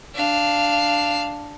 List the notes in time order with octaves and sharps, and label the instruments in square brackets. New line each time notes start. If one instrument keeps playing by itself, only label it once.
[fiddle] D4 F5